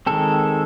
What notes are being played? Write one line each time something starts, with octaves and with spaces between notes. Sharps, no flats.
D#3 G#3 C4 A4